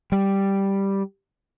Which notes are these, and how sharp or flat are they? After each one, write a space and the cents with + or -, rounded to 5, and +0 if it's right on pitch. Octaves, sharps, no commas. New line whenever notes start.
G3 +0